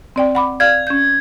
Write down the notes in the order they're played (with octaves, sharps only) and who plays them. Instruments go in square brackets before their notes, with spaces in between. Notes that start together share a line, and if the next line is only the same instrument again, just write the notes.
[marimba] C4 D5 G5
F#5 B5 D6
[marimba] D5 F5 F6 [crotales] G#6
[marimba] C#4 G6